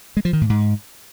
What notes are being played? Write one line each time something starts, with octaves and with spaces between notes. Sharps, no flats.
G#3
F3
D#3
A2
G#2